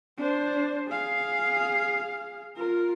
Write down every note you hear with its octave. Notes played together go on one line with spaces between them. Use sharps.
D4 C5
G#4 F5
F4 A#4